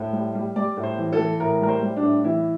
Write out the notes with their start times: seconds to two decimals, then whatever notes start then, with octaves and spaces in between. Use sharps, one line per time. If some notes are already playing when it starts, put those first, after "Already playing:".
Already playing: A2 C5
0.13 G3
0.35 G3
0.56 G3 D5
0.77 A2
0.83 C5
0.98 E3
1.13 A4
1.19 E3
1.40 A2 A#4
1.61 G3 A#4
1.69 C5
1.82 G3
1.97 D4
2.03 A2
2.24 E3 E4